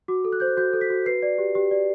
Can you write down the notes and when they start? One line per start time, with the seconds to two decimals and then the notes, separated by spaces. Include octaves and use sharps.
0.08 F#4 D6
0.25 A4
0.32 F#6
0.40 C5 G6
0.47 F#6
0.57 F#4 G6
0.73 A4
0.81 B6
0.90 F#4
1.06 B4 C7
1.22 D5
1.38 G4
1.55 G4
1.71 D5